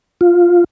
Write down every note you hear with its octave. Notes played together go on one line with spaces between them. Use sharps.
F4